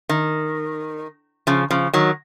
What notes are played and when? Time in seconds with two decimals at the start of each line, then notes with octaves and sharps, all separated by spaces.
0.09 D#3
1.47 C#3 F3
1.71 C#3 F3
1.94 D#3 F#3